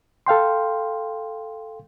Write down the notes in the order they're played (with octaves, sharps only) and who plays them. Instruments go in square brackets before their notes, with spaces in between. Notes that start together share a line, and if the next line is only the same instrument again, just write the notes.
[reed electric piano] A4 F5 G5 C6